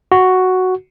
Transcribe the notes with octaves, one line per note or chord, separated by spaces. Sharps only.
F#4